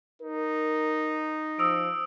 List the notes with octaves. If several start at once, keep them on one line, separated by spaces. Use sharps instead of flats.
D#4 A#4
F3 D#6 E6 D7